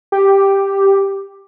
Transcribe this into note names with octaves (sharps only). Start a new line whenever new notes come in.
G4